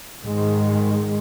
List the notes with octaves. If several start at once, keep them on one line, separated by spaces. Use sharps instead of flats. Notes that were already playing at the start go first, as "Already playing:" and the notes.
G#2 D#3 G#3